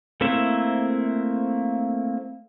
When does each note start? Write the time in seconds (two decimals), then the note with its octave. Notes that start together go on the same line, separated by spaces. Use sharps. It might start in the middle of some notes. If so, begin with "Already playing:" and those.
0.21 A3 A#3 C4 E4 E5